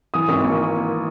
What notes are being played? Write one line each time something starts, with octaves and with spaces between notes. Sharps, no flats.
E3 D#6
G#1
A#3 C#6